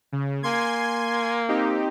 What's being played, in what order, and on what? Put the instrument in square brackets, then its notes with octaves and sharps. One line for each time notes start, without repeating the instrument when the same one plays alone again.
[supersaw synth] C#3
[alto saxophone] A#3 [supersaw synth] G#5 C6 G#6
[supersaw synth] C4 D#4 G4